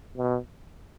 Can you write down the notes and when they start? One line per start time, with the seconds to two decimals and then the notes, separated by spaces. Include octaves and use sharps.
0.17 B2